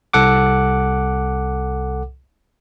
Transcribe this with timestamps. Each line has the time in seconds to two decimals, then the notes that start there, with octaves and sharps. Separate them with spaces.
0.13 C2 A4 F#5 D6